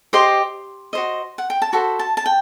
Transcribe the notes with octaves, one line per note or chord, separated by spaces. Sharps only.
G4 C5 D#5 C6
F#4 C5 D#5
F#5
G5
A5
F#4 A4 C5 B5
A5
A5
G5